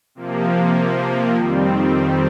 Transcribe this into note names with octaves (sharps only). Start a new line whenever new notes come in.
C3 F3 A#3
F2 D#3 G3 C4